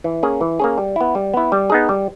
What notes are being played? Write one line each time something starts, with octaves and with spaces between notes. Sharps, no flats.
E3
A#3 C#4 G#4
E3
A#3 C#4 G#4
G3
B3 E4
G3
B3 E4
G3
B3 D#4 G#4
G3